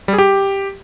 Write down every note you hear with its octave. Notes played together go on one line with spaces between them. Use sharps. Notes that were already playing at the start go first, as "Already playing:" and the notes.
G3
G#4
G4